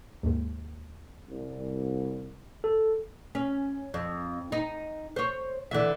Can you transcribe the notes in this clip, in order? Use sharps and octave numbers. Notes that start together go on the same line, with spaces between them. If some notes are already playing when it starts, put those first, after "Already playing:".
D#2 G#2
C2
A4
C#4
F2
D#4
C5 C#5
D3 E3 E5